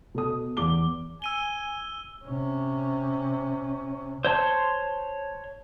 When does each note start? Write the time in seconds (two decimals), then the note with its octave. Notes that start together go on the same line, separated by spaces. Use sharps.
0.14 B2 A4 D#6
0.57 E2 D6 G7
1.22 G#5 E6 D#7 G7
2.25 C3 C#4
4.25 C5 C#5 A5 C6